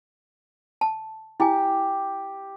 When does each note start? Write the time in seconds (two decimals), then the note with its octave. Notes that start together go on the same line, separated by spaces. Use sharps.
0.81 A5
1.40 E4 G4 G#5